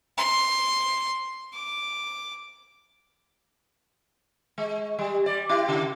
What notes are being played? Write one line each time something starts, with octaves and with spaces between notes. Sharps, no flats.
C6
D6
G#3
G3
G3 D5
E4 G4
C#3